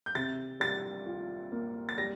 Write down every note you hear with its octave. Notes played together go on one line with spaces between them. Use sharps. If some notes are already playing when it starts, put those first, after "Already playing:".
G6
C3 A6
G3 A6
F4
A#3
A6
G3 A#6